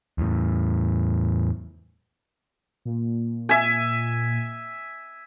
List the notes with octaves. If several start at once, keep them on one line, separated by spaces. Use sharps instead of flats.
E2 A2
A#2
E5 G#5